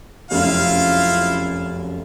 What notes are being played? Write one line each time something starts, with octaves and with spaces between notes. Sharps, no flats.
F1 F#2 E4 F4 F5